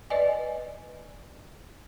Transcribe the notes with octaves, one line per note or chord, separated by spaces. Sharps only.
B4 D5 D#5 G#5